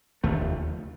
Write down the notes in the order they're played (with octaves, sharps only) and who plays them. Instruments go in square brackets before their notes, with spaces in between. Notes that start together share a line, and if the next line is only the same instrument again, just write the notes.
[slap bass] F1 D#2 D3 A3